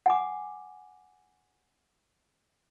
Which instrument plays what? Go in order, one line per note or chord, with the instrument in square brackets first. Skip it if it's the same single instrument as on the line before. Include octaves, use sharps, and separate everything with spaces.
[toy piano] F#5 G#5 D6